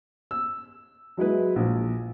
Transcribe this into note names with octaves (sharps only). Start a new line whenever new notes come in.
E6
F#3 G#3 E4 B4
A#1